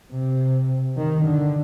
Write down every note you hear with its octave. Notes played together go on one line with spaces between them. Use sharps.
C3
D#3
D3